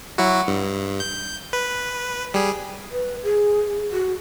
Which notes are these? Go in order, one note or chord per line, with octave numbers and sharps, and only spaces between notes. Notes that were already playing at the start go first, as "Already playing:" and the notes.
F#3 E4 F#4
G2
G6
B4
G3 G#4
B4
G#4
F#4